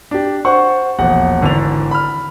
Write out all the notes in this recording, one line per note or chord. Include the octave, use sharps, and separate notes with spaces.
D4 G4
C5 F#5 C#6
E1 A#1 F#5
G#1 D3 E3 D4 F7
B5 F6